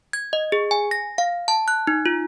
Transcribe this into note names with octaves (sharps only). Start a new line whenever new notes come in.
G#6
D#5
G#4
G#5
A#6
F5
A5
F#6
D#4
F4